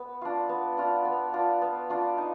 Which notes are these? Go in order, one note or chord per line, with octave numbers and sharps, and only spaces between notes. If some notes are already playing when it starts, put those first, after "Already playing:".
Already playing: B3
D4 F4
B3
D4 F4
B3
D4 F4
B3
D4 F4
D#4